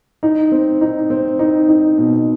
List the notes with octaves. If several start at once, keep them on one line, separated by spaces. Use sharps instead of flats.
D#4
C4
D#4
C4
D#4
D#4
B2